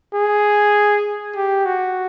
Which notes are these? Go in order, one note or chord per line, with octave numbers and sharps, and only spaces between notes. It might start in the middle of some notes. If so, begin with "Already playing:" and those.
G#4
G4
F#4